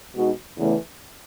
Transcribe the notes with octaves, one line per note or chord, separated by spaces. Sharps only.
B2 G#3 D#4 F#4
E2 C#3 E3 A3